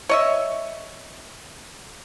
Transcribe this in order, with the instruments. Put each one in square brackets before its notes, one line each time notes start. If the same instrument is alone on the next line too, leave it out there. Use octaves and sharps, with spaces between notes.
[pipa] C#5 D#5 E5